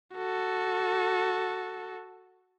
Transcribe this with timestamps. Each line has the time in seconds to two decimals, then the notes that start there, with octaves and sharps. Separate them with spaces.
0.15 F#4 A4